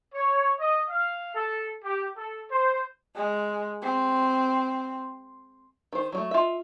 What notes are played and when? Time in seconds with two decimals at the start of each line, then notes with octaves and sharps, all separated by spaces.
0.15 C#5
0.60 D#5
0.89 F5
1.35 A4
1.85 G4
2.17 A4
2.51 C5
3.15 G#3
3.82 C4
5.93 D#3 C5
6.12 F#3 G3 A3
6.31 F4 D#5 E5